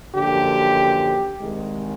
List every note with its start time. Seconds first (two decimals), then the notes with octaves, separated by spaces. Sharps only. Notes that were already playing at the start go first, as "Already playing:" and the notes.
0.15 F#2 D3 F3 A#3 G4
1.39 C2 C3 D#3 G#3